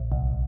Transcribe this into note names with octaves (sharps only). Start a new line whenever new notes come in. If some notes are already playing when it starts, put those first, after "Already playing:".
Already playing: A#1
C2